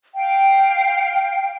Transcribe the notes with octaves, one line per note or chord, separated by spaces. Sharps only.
F5 G5